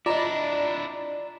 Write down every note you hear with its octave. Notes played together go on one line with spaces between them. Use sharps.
D4 E4 F4 D5 D#5 A#5